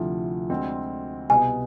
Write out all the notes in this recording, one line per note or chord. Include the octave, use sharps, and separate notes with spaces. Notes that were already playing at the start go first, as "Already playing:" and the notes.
Already playing: D2 C3 F3 A3 E4
D2 D3 G#3 C4
C2 B2 B3 G#5